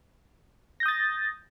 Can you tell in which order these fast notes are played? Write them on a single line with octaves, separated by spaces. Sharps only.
A#6 G6 D#6 A6